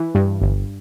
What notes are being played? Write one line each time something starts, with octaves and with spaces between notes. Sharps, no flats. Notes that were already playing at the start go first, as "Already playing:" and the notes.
Already playing: E3
G2
G1